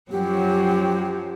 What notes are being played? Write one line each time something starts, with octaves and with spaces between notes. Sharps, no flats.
F#2 F3 F#3 G4